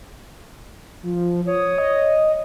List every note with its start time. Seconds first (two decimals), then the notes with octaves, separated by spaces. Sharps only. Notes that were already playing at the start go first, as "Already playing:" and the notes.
1.03 F3
1.47 C#5 D#6
1.78 D#5